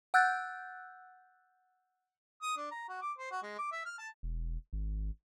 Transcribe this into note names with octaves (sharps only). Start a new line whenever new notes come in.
F#5 E6 F#6 G6 A6
D#6
D4
A#5
F#4
D6
C5
F#4
G#3
D6
E5
F6
A5
E1
G#1